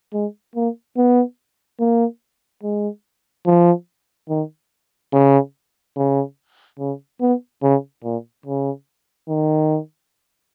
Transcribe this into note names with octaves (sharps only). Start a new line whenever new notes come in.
G#3
A#3
B3
A#3
G#3
F3
D#3
C#3
C#3
C#3
B3
C#3
A#2
C#3
D#3